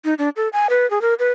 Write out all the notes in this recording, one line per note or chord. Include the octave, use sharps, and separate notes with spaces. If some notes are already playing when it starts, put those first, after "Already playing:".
D#4
D4
A4
G#5
B4
G#4
A#4
B4